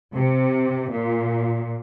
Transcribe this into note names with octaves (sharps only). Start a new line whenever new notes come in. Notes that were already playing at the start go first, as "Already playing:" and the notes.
C3
A#2